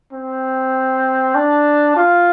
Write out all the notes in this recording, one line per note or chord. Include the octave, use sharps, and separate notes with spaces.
C4
D4
F4